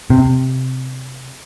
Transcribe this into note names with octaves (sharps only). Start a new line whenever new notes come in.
C3